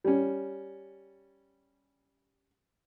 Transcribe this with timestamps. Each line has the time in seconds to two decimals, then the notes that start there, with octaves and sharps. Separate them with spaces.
0.04 G3 C#4